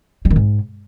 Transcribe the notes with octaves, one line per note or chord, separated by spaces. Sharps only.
G3
D#3
G#2